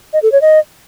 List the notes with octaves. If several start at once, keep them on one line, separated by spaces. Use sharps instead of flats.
D#5
A4
C#5
D#5